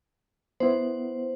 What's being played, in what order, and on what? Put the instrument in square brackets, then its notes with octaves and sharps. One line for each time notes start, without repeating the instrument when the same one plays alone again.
[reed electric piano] B3 E4 [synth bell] C5